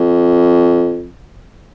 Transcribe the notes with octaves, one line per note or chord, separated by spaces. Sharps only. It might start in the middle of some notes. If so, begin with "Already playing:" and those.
Already playing: F2